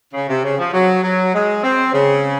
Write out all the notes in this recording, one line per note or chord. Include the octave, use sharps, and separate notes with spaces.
C#3
C3
C#3
F3
F#3
F#3
G#3
C4
C#3